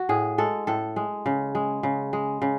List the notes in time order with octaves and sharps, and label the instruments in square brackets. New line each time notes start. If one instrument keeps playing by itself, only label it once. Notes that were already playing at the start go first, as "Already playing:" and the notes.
Already playing: [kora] F#4
A2 G#4
G#3 A4
A2 A4
G#3
C#3
G#3
C#3
G#3
C#3